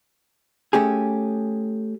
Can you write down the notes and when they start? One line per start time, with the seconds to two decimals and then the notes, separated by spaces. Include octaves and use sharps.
0.73 A3 C#4 G4 G#4